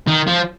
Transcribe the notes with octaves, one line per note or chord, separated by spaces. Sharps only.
D#3
F3